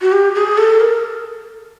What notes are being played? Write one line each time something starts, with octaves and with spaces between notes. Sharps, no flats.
F#4
G4
G#4
A4
A#4